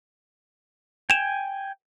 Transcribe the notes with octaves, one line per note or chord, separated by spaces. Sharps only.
G5 G#5 E7 F7